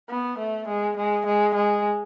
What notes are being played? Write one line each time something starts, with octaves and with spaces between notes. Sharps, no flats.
B3
A3
G#3
G#3
G#3
G#3